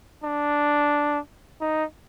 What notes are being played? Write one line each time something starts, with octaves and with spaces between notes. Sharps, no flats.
D4
D#4